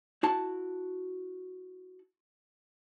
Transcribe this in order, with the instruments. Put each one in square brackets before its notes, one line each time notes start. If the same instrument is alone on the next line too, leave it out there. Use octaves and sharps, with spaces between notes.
[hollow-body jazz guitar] E4 F#4 A5